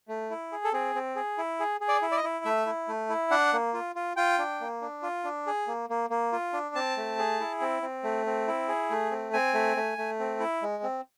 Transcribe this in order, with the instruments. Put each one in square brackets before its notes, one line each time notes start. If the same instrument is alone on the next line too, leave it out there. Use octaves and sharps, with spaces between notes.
[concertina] A3
E4
G#4
A4
C4 G#4
C4
G#4
E4
G#4
G#4
D5
E4
D5
D#5
E4
A3 E5
E4
A3
E4
D4 F#5
A#3
F4
F4
F4 G5
D4
A#3
D4
F4
D4
G#4
A#3
A#3
A#3
F4
D4
C4 A5
A3
G#4
E4
C4
C4
A3
C4
E4
G#4
A3
C4
C4 G#5
A3
A3
A3
C4
E4
G#3
C4